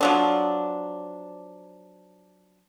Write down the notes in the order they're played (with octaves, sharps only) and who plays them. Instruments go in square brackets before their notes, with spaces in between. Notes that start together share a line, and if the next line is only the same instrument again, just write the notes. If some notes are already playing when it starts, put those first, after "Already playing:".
[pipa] F3 F#3 D4